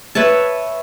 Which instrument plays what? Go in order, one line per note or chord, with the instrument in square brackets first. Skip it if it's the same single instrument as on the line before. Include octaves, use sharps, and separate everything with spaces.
[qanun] B4 C#5 E5 A5